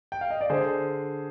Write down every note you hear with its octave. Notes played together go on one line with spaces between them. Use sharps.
G5
F5
D#5
D5
D3 G#4 C5